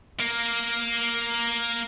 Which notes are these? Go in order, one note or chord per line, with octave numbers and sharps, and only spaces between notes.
A#3 A#4